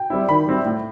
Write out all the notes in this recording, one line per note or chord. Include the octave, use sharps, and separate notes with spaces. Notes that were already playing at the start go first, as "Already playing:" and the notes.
Already playing: G5
G3 C4 E4
D#3 B5
G3 C4 E4
A2